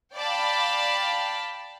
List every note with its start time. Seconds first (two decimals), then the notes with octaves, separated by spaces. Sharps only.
0.15 D5 F5 G5 A5 B5